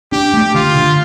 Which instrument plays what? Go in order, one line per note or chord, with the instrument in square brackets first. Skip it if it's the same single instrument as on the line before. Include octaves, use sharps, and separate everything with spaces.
[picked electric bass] D4 [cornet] G4
[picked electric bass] A3
[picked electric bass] D3 [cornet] F4
[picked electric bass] D3